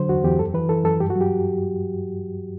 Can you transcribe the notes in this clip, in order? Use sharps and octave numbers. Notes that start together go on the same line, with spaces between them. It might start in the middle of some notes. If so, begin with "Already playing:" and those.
Already playing: D3 F#3 C5
E2 F#4
E2 G4
F#2 A4
E3 B4
E3 A4
F#2 A4
G2 G4
F#4
F#3 G4